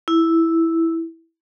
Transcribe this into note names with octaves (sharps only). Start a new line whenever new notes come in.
E4